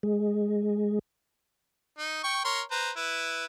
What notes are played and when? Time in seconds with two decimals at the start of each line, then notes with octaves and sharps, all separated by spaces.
0.03 G#3
1.99 D#4
2.24 G5 C#6
2.45 A#4 C#5 C6
2.71 B4 C5 A#5
2.96 E4 B4